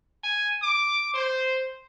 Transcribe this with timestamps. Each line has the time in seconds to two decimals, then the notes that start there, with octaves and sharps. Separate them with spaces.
0.24 G#5
0.63 D6
1.14 C5